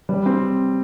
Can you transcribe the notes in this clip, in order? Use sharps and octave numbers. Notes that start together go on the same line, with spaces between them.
G3
C4